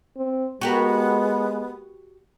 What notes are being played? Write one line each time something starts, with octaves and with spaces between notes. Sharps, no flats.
C4
G#3 B3 F#4 G4 A#4